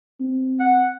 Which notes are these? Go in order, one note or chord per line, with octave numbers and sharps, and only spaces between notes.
C4
F#5